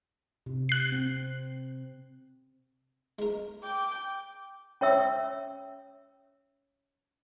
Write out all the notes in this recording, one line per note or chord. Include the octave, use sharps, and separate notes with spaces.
C3
F#6 C7
C4
G#3 A#4
G5 D6
C#4 C#5 E5 E6